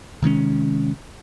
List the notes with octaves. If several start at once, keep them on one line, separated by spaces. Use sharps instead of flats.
C3 D#3 G#3 C#4